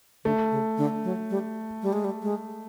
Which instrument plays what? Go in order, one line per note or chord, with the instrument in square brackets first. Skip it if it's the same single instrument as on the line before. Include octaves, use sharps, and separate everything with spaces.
[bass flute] D3 [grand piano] A3
[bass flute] C#3
D3
F#3
G3
G3
G#3
G3
G#3